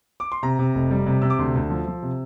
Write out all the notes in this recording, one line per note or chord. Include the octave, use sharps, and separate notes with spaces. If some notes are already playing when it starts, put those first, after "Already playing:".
D6
C6
C3 A#5
C3
F1
G3
C3
C3 E6
D6
D2 C6
D2
F3
F3
C3